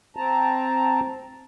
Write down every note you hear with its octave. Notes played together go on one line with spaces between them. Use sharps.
C4 A5 A#5